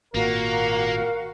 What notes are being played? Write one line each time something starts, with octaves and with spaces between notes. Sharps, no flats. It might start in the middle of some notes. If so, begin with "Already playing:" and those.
G#1 A#2 A#3 F#4 A#4 F5